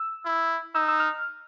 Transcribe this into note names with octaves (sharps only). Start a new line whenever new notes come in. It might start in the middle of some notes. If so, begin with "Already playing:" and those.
Already playing: E6
E4
D#4 E6
E6
F6